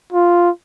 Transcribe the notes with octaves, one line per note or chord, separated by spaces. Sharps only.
F4